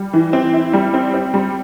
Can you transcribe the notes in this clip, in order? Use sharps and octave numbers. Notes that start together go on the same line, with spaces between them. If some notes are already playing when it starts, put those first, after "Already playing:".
Already playing: G3
E3
C4
E4
G3
C4
C4
G3